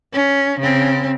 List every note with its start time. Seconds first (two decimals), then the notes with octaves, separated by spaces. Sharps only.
0.13 C#4
0.59 C#3 C4